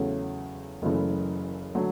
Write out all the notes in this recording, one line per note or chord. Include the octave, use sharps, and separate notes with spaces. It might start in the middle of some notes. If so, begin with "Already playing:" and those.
Already playing: E2 C#3 F#3 A3 C#4
F#1 F#2 C#3 E3 A3
D3 F#3 A3